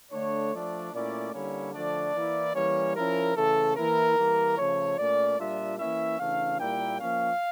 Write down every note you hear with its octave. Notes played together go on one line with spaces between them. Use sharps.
D3 A3 D4 C#5
F3 A3 D4 D5
A#2 A3 C#4 E4 D5
D3 G3 A#3 C#4 E4 C#5
D3 F3 A3 D4 D5
E3 A#3 E4
E3 G3 A#3 C#4 C#5
F3 C#4 E4 A#4
C#3 E3 A3 A4
E3 A#3 E4 A#4
E3 G3 A#3
C#3 F3 A3 C#5
A#2 A3 C#4 D5
A#2 G3 D4 F4 E5
E3 A#3 C#4 E4 E5
C#3 E3 A3 D4 F5
A#2 G3 A#3 E4 G5
F3 A#3 C#4 F5